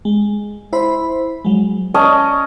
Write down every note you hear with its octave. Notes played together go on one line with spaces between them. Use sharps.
G#3
E4 C5 B5
F#3 G#3
C#4 D5 D#5 A5